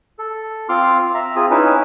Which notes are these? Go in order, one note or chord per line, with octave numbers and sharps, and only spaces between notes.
A4
C4 F4 C6 D6 F6
E5 A#5
C4 F4 G#4 G#5
C#4 D#4 E4 B4